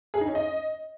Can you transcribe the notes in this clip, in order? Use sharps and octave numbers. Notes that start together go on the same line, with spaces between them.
G#4
D#4
C#4
D#5